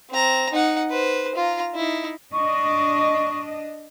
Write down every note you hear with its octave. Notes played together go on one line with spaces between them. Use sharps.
C4 A#5
D#4 F#5
B4 C5
F4 A#5
D#4 E4
D4 D#5 C#6